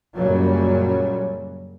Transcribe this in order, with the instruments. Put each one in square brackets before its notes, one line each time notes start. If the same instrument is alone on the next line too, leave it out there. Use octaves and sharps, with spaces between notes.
[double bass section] F#2 A#2 C#3 F#3 G3